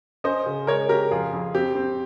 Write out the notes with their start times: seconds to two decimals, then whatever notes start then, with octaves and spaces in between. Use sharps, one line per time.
0.24 C#4 C5 D#5
0.46 C#3
0.67 G#3 A#4 C#5
0.89 C#3 G4 A#4
1.11 F2 F4 G#4
1.33 F2
1.54 C4 G4
1.75 C4